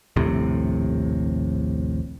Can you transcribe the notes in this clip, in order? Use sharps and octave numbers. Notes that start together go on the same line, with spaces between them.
D#1 A#1 A2 C3